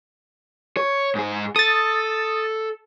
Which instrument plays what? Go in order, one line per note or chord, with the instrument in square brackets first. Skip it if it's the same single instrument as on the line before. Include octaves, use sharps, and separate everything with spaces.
[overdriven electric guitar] C#5
G#2 G#4
[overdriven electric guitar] A4 [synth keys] D#6 A6